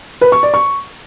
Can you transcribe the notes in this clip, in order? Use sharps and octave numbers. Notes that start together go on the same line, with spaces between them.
B4
C#6
D5
C#6